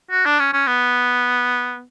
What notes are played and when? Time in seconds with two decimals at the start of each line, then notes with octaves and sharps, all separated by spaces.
0.11 F#4
0.26 D4
0.39 C#4
0.53 C#4
0.67 B3